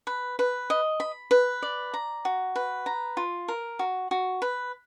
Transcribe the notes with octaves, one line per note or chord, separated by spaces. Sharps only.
B4
B4
D#5
B5
B4
D5
A#5
F#4
B4
A#5
F4
A#4
F#4
F#4
B4